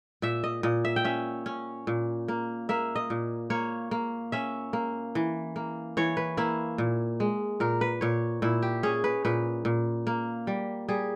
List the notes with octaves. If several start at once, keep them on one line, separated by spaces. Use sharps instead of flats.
A#2 E5
D#5
A#2 D#5
E5
G5
C#4 E5
C#4
A#2
A#3
A#3 E5
D#5
A#2
A#3 C#5
A#3
C#4 E5
A#3
E3
A#3
E3 C#5
B4
A#3 E4
A#2
G#3
A#2 A#4
B4
A#2 C#5
A#2 E4
G4
C#4 G#4
B4
A#2 B4
A#2
A#3
G3
G3 G#4